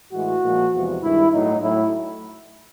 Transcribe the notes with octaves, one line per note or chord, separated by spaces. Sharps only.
A2 E3 G#3 F#4
A#2 F3 G#3
E2 C3 F3 G#3
G2 D#3 G#3 E4
A2 F#3 D#4
A2 F#3 E4